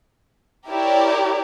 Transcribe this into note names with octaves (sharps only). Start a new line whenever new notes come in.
E4 G4 A#4 C#5 D5